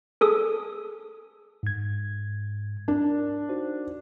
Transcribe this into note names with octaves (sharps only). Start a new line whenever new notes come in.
G#4 A4 D#6
G#2 G#6
D4 A#4
D#4 F#4 C5